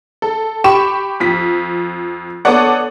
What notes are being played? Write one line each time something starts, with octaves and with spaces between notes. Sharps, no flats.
A4
G4 B5 C#6 E7
F2 B6
B3 D4 A4 C#5 D5 F#5